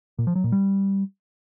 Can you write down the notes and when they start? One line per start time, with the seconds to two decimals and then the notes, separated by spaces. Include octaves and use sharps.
0.19 A#2
0.27 F3
0.35 F#3
0.44 A#2
0.52 G3